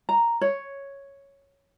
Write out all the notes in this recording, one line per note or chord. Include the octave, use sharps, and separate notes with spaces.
A#5
C#5